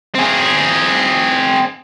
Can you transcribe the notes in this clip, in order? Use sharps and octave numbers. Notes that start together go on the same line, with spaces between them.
C4 G#4